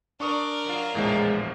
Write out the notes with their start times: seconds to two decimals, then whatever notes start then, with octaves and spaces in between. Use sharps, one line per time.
0.20 D4 A#4 D5 C#6 D#6
0.65 F#2 F#3 F4
0.95 A#1 E2 A2 C3 F3 G#3 A3